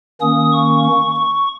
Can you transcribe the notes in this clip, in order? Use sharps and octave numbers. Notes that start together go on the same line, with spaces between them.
D#3 A#3 C#4 D#6
C#6
C#6
C#6